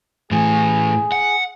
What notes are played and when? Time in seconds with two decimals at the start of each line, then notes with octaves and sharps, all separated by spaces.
0.31 A2 E3 G#4
1.12 F#5